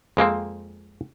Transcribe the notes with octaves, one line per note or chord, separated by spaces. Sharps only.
F2 G#3 A#3 C4